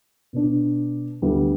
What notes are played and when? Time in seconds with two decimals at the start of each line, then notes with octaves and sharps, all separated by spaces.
0.33 B2 B3 D4
1.22 D2 D3 G3 B3 D4